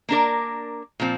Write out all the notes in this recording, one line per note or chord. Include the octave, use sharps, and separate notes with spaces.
A#3 D4 A#4 D5
A#2 F3 C4